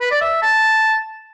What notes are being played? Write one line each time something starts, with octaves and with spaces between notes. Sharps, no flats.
B4
D5
E5
A5